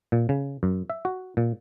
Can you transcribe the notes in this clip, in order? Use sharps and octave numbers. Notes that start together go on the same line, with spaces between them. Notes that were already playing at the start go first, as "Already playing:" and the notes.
A#2
C#3
F#2
E5
F#4
A#2